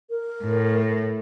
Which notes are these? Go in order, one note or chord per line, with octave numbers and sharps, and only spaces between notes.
A#4
A2